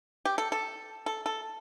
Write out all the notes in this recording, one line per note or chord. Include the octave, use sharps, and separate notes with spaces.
G4
A4
A4
A4
A4